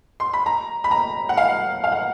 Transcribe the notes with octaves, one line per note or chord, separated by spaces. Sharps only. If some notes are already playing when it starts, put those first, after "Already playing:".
C6
B5
A#5
B5
A#5
F#5
F5
F5
F#5